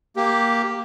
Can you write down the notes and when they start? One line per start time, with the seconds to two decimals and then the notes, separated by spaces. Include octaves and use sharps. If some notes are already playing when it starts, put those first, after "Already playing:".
0.16 A#3 G4